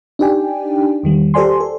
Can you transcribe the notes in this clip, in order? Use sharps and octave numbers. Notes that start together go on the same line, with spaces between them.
D4 D#4 G4 D5 G5 G#5
E2 D#3 G3
G4 A4 C5 D5 G#5 C6
A4